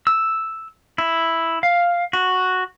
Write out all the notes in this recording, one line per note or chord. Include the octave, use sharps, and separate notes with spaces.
E6
E4
F5
F#4